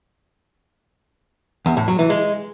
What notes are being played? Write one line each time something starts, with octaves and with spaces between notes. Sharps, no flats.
E2
A2
F#3
E3
G#3